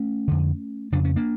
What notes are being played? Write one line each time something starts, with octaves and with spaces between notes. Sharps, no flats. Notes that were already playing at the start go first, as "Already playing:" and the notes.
Already playing: A3 C#4
F2 D3
F2 C#3 D4
C#4
A#3 D4